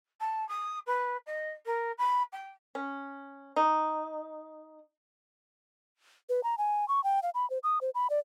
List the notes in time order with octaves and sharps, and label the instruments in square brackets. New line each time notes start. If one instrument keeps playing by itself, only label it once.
[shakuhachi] A5
D#6
B4
D#5
A#4
B5
G5
[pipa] C#4
D#4
[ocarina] B4
A#5
G#5
C#6
G5
F5
B5
C5
D#6
C5
B5
D5